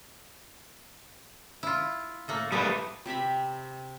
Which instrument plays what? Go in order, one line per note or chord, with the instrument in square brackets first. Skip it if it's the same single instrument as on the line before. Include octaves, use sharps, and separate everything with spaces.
[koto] E4 F4
A2 A3 A#3
[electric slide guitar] G3 A3 B4 [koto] G#4 D5
[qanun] C3 G4 E5 B5